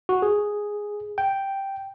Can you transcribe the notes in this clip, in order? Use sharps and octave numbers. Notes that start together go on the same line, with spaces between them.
F#4
G#4
G5